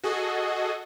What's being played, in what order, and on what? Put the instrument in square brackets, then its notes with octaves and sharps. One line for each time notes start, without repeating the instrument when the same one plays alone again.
[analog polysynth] F#4 G#4 A4 D#5